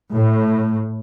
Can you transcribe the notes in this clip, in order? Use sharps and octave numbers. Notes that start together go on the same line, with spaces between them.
A2